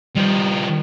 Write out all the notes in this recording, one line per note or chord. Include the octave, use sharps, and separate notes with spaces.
D#3 F3 G3